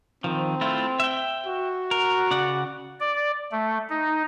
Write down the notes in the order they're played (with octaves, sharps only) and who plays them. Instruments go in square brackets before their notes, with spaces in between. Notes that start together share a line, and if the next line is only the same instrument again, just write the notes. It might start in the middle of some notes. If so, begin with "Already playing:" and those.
[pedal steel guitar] D#3 F3 [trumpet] C4
[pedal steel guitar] A3 E4 F4
E5 G5
[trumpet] F#4
[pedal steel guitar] A#4
C#3 D5 F#5
[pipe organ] D5
A3
D#4